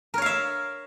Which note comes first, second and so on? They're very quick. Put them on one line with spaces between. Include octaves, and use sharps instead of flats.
A#4 C#5 F5 E5